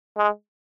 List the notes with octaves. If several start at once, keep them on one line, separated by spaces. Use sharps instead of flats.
G#3